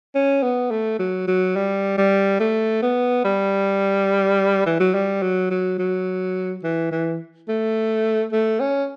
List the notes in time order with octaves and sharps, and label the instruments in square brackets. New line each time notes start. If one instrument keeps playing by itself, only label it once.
[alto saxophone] C#4
B3
A3
F#3
F#3
G3
G3
A3
B3
G3
E3
F#3
G3
F#3
F#3
F#3
E3
E3
A3
A3
C#4